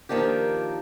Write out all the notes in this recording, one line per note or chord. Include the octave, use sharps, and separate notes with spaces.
D#3 F3 A#3 D4 G4